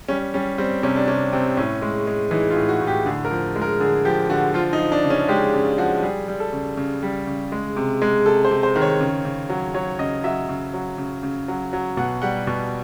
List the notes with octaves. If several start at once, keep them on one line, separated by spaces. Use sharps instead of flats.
G3 C#4
G3 C#4
G3 C4
C3 C#4
D4
C3 C#4
C3 C4
A2 C#4
G#3
G#3
E3 D#4
F4
A2
F#4
A2
G4
D3 G#4
A#4
F3
G#3
A#4
D3 G#4
F3 G4
D3 F#4
F3 F4
D#4
F3
D4
C#3
C#4
G#3 G4
C#3
F3 F#4
G3 G#4
G3
A4
C#3
C#3
G3
C#3
G#3
C3
G#3
C3 A4
C5
C3
C5
D#3
C#5
C#3
C#3
F#3
F#3 C#5
C#3 D#5
F#3 E5
C#3
F#3
C#3
C#3
F#3
F#3
B2 F#5
G3 F#5
B2